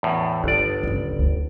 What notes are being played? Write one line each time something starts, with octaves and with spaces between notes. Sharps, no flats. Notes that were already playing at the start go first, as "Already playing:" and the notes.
E2 A2
G1 D#3 D5
F#1 D2
D2